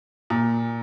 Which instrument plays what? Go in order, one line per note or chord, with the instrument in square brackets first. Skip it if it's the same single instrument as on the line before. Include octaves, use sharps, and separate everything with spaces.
[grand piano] A#2